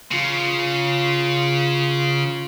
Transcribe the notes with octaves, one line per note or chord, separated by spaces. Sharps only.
C#3 F4